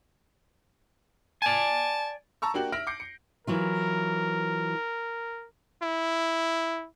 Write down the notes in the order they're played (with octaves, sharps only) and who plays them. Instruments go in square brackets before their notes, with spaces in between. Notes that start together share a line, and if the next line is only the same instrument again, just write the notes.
[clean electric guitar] D5 G#5 [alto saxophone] A5
[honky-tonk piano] A5 A#5 C#6 E6
A#3 D4 F#4 G4 F#7
E5 F6 A#6 D7
D6 G6 C7 C#7
C#7
[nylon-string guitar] E3 F#3 F4 [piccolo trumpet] A#4
[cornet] E4